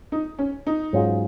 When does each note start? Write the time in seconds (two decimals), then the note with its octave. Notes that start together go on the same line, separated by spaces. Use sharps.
0.12 D#4
0.39 C#4
0.67 D#4
0.93 G#2 F#3 C#4 F4 G#4